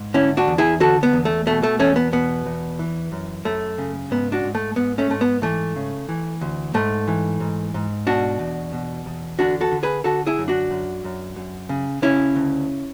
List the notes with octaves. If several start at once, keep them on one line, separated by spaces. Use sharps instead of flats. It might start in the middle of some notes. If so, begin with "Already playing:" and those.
Already playing: G#2
D3 C#4 E4
D4 F#4
E2
E4 G#4
D3 F#4 A4
B3
E2
A3
B2 A3
A3
E2 A3 C#4
B3
B2 B3
E2
E3
F#2
F#2 A3
C#3
G#2 B3
D4 F#4
G#2
A3
G#2 B3
A3 C#4
G#2 A3
B3
E3 A3
C#3
E3
D2
G#2 A3
E3
G#2
G#2
B2 D4 F#4
E2
B2
E2
D3 D4 F#4
F#4 A4
D3
G#4 B4
D3 F#4 A4
E4 G#4
F#2
D4 F#4
F#2
F#2
F#2
C#3
C#3 C#4 E4
D2